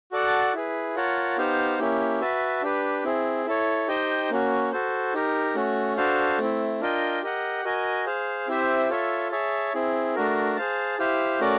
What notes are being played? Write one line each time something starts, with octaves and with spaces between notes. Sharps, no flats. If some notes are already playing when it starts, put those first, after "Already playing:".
F#4 A4 D5 F#5 A5
E4 G#4 B4
F4 A#4 C#5 F#5 A5
B3 D#4 G4 C5 F5
A#3 C#4 E4 G4
F#4 B4 E5 A5
D4 G4 B4
C4 E4 G#4
E4 A4 C#5
D#4 G4 C5 D#5 G5
A#3 C#4 F#4
F#4 A4 C5
D#4 G4 A#4
A3 C#4 F#4
D4 F#4 A4 C5 F5
A3 C4 E4
D4 F4 A#4 D#5 G5
G4 A#4 D#5 F#5
F#4 A#4 D#5 G#5
G#4 C5 F5
C4 E4 G4 C5 E5
F4 A4 C#5 E5
G#4 C#5 E5 A5
C4 E4 G#4
A3 D4 F#4 A#4
G#4 C5 F5 A5
E4 G4 C5 F5
A3 C#4 F#4 A#4 D5